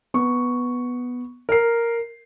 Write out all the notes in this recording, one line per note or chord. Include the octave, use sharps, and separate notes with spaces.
B3 C#6
A#4 C7